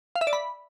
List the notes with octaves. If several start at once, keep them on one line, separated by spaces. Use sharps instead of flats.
F5
E5
D5
B5